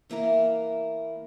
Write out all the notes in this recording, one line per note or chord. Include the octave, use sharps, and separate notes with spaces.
E3 A#3 E4 A#4